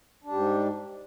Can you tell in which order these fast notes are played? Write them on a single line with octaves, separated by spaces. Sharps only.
D4 G3 G#2